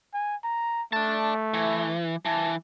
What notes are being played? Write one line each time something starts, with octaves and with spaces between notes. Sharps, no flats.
G#5
A#5
A3 D5 A5
E3
E3 A5